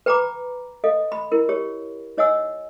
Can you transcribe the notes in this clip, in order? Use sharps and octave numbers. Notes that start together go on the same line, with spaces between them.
B4 G5 A#5 B5 D6
A4 D#5 F5
B5
E4 A#4
G4 C#5
D#4 C#5 D#5 F#5 G#5 E6